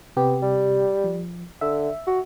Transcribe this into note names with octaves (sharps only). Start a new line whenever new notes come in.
C3 B3 G4
G3
F3
D3 E5
F#4